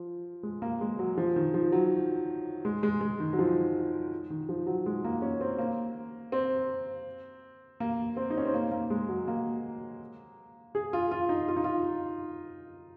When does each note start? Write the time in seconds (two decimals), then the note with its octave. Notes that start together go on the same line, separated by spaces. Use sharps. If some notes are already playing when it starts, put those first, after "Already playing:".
Already playing: F3
0.43 G#3
0.62 A#3
0.81 G#3
0.99 F#3
1.17 F3
1.36 D#3
1.54 F3
1.72 F#3
2.65 G#3
2.83 G#3
3.01 G#3
3.20 D#3
3.33 F#3
3.39 F3
4.30 D#3
4.49 F3
4.67 F#3
4.86 G#3
5.04 A#3
5.22 C#4
5.41 C4
5.58 A#3
6.32 C4
7.80 A#3
8.17 C4
8.30 D#4
8.37 C#4
8.46 C4
8.54 A#3
8.72 A#3
8.90 G#3
9.09 F#3
9.28 A#3
10.75 G#4
10.93 F4
11.11 F4
11.29 D#4
11.48 F4
11.57 D#4
11.64 F4